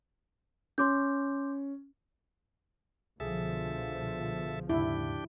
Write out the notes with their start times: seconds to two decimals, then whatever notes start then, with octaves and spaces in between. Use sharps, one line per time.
0.78 C#4 C6 D6 G6
3.20 C2 B2 D3 F3 G#4 A4 E5
4.69 D#2 G#2 C#3 D4 E4 G4